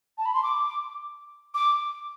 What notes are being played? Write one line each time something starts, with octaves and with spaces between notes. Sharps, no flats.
A5
B5
C6
D6
D6